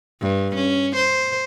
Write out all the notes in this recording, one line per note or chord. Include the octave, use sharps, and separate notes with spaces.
G2
C#4
C5